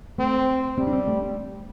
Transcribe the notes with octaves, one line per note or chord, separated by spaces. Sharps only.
A3 C4
G3 C4
D4
C4
A3